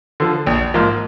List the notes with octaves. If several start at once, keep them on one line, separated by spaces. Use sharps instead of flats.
D3 F3
A#1
G#2 F3 A#3